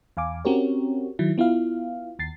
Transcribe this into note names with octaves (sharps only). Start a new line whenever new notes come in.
E2 F5 G#5 D6
C4 C#4 F#4 G4 A#4 C#5
D#3 F#3 E4
B3 E4 F4 F5
D#2 A6 C7